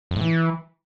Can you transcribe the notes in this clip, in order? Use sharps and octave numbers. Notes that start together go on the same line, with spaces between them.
F2
A2
E3